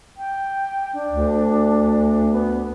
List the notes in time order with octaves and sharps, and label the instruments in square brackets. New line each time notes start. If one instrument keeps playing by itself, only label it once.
[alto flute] G5
D4
[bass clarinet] D2
[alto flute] B3